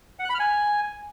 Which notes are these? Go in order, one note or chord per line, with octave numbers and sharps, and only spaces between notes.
F#5
F#6
B5
F6
G#5